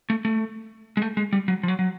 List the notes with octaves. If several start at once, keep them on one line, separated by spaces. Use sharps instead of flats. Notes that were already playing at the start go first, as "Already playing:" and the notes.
A3
A3
G#3
A3
G#3
G3
F#3
F3
F#3
F#3